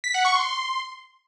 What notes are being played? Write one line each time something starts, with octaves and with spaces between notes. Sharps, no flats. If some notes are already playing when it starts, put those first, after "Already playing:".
B6
F#5
C#6
C6